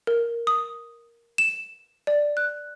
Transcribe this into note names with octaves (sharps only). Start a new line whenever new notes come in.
A#4
D#6
E7
D5
F#6